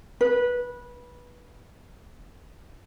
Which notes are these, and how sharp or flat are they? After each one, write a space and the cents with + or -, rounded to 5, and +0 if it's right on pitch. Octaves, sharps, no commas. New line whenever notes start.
B4 -20